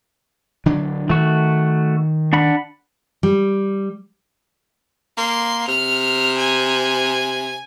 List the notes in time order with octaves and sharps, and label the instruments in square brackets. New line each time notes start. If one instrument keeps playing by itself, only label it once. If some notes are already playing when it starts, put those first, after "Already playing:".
[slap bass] D3 F#3 D4
[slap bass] D#3 [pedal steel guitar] A3 F#4
[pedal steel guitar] D4 F#5 B5
[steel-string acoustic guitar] G3
[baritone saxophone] A#3 [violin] C6
[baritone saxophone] C3 [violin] F6
[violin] G#5